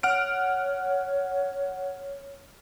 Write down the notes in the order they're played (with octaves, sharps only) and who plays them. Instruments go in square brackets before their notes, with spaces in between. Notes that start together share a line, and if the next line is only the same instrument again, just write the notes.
[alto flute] C#5 [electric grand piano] F#5 F6 D7